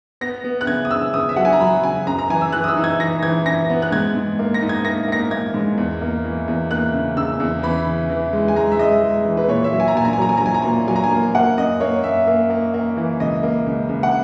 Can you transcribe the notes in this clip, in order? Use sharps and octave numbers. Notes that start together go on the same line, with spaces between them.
B3 A#6
B3
F#6
C#3 G#6
D#6
C#3 E6
C#3 D#6
E5
F#3 F#5
G#5
A#5
F#3 B5
C#3 G#5
F#2 A#5
A#5
E3 G#5
E6
E3 F#6
D#6
E6
D#4
G#6
E3 A#6
E3 G#6
F#2 A#6
B3
F#6
G#2 G#6
G#2
A#3
A#6
D#4
G#6
A#3 A#6
A#3 A#6
A#3 G#6
G#2
E2
A#3
E3
E2
A#3 F#6
C#3
C#3 E6
E2
E3 B5
C#3
E3
G#3
G#5
G#3 A#5
E5
G#3 D#5
G#3
E3
B4
A#2 C#5
E5
F#3
G#5
A#5
A#2 G#5
A#5
G#5
F#3 A#5
G#5
A#5
F#3 G#5
A#5
A#2 G#5
F#3 G#5
A#5
G#5
A#3
A#3 F#5
F#2 D#5
A#3 C#5
F#2 E5
A#3
A#3
A#3
E3
C#2 D#5
A#3
C#2
C#2
F#5